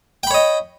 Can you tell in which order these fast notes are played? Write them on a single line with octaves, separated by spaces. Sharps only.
G5 B5 C#5 D#5